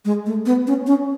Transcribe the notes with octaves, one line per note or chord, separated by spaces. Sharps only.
G#3
A3
B3
C#4
C#4